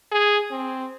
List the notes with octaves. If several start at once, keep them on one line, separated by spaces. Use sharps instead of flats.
G#4
C4